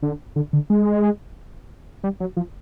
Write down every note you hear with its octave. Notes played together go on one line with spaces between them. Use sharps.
D3
D3
D3
G#3
G3
F#3
F3